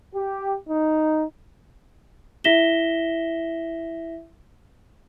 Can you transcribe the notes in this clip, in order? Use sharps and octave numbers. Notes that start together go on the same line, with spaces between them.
G4
D#4
E4 E5 A#6 B6 E7 G7